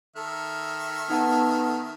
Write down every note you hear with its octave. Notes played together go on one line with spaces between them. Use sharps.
D#3 A4 E5 F6
B3 D#4 F#5 A5